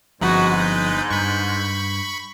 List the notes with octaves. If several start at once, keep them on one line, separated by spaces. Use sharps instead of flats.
G1 G#2 F3 C4 D#4 F#4 B4
G6
G2 B5 C#6